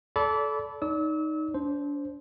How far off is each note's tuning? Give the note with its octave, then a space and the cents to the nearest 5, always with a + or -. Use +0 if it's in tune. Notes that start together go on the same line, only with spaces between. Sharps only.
A4 -20 D5 -30 B5 +0
D#4 +0 D5 -35 E6 -35
D4 -35 C5 +0